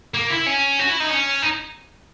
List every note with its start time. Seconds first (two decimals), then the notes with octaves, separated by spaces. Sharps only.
0.14 A#3
0.30 E4
0.46 C#4
0.79 F#4
0.89 E4
1.00 D#4
1.10 C#4
1.43 D#4